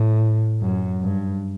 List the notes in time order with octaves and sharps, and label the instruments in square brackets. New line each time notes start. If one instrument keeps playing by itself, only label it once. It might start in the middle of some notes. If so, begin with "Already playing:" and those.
Already playing: [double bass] A2
F#2
G2